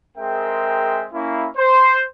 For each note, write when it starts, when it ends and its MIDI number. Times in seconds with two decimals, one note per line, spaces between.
0.17 1.07 56
0.17 1.07 60
0.17 1.07 68
0.17 1.07 70
0.17 1.07 76
0.17 1.07 79
1.13 1.48 58
1.13 1.48 61
1.13 1.48 64
1.56 2.02 72